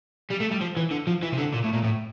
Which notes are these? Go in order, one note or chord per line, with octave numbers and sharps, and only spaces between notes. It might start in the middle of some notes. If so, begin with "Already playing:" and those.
G3
A3
G3
F3
E3
D3
F3
E3
C3
D3
A#2
A2
A#2
A2